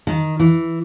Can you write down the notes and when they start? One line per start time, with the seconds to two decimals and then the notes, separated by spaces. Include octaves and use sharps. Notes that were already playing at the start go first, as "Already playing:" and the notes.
0.07 D#3
0.40 E3